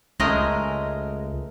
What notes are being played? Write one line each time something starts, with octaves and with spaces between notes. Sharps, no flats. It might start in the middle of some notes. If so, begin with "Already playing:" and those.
C#2 G#3 A3 A#4 D#5